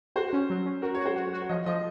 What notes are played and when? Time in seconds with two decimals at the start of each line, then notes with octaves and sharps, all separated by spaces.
0.16 F#4 C5
0.33 C#4
0.50 F#3
0.65 C#4
0.82 F#4 A#4
0.95 C#5
1.00 F#4
1.06 C5
1.16 F#4
1.27 C#5
1.33 F#4
1.42 C#5
1.49 F3 D#5
1.66 F3 D#5